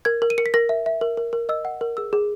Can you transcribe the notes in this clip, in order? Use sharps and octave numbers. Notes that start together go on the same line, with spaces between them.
A#4 G#6
A#4
D#7
A#4 C#7
B6
A#4 A#6
E5
E5
A#4
A#4
A#4
D#5 E6
F#5
A#4
G#4 E6
G#4